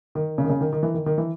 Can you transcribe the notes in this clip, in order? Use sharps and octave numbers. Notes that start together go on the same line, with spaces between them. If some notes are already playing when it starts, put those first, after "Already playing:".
D#3
C#3
D#3
C#3
D#3
D#3
E3
D#3
D#3
E3